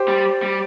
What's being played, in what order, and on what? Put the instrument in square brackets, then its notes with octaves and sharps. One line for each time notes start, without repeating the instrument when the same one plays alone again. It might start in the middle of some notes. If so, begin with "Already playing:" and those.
Already playing: [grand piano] G4 C5
[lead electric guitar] G3
G3